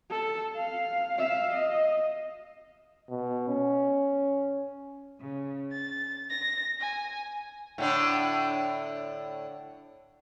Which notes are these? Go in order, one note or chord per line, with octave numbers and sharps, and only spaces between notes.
A4
F5
E5 F5
D#5
B2
C#4
C#3
A6
A#6
G#5
A2 D3 D4